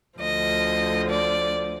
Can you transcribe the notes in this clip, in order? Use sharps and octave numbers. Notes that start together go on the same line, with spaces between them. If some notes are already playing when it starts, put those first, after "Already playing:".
D2 D3 F3 D#5
D5